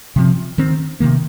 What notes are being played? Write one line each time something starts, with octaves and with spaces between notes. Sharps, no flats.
C3 F3 C4
D#3 C4
C3 D#3 A#3